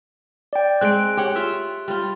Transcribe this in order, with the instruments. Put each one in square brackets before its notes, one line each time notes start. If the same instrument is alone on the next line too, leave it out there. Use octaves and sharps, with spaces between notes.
[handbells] D5 G5
[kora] G#3 C4 [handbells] F#6 D7
[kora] G4 C#5 F#5
F4 E5
G3 F4